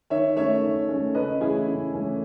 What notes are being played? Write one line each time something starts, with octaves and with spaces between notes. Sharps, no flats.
D#3 C#5 E5
A3 C#4 C#5 E5
D#3
A3 C#4
C#3 B4 D#5
E3 A3 C#4 E4 G#4
C#3
E3 A3 C#4